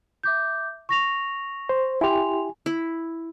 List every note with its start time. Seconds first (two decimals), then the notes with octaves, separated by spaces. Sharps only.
0.23 E5 D6 G6
0.89 C#6 A#6 F7
1.69 C5
2.01 E4 G4 G#5 C6 F7
2.66 E4